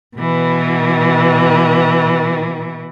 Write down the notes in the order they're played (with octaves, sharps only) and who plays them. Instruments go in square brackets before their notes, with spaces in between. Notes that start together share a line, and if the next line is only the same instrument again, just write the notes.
[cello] B2 E3